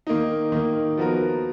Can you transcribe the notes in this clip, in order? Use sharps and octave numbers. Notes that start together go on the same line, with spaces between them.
D#3 A#3 D#4
D#3 A#3 D#4
F3 B3 F#4 A#4